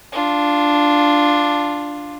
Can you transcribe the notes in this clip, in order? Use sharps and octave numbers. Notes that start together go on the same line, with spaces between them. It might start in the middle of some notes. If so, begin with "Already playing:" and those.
D4 F4